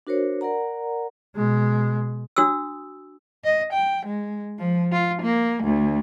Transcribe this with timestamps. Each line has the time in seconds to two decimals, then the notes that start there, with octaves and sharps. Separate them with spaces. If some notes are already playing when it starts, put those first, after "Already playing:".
0.07 D4 F#4 A#4 C5 C#5
0.41 A#4 D5 F#5 A#5
1.36 B2 G#3
2.37 D4 F#4 D#6 E6
3.44 D#5
3.73 G5
4.06 G#3
4.58 F3
4.92 F4
5.22 A#3
5.64 D2